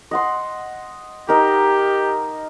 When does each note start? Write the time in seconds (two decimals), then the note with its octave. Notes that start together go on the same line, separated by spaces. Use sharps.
0.11 D#5 F#5 C6
1.29 D#4 G4 A#4